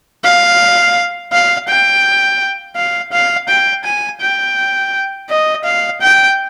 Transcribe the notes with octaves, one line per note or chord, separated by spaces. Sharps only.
F5
F5
G5
F5
F5
G5
G#5
G5
D#5
F5
G5